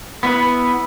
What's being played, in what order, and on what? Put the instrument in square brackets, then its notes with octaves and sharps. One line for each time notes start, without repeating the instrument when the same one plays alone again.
[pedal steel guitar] B3 E4 B4